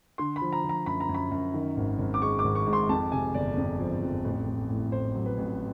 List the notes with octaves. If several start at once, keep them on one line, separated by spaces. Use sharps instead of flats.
D3 C6
B5
F3
A#5
F3
A#5
F#2 B5
A#5
F#2
B5
F#2
D#3
G#1
G#1
D6
G#3 C#6
D6
G#1
C#6
G#2
C6
F2 A5
C3 G#5
G1 D5
F2
F3
F2
A1
A1
A2
A2 C5
F#3
B4
A1